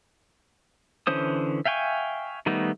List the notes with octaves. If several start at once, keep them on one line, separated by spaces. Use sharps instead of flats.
D3 E3 C#4 C5 D#6
E5 F5 G5 G#5 C#6
D#3 G3 A3 B3 D#4